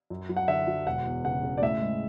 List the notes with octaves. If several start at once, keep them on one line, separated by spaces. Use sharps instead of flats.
F#2
F#3
F#5
D3 E5
F#3
E1 F#5
E2
C#3 F#5
C#3
D5
A2 E5
G#3